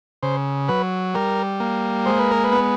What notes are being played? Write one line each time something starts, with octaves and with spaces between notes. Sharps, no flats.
C#3 C5
F#3 B4
G3 A#4
A#3
G#3 C5
B4
A#4
B4
B3